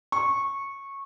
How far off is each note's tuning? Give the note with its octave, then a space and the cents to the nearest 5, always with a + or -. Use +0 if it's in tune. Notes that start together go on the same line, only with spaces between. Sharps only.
C#6 -15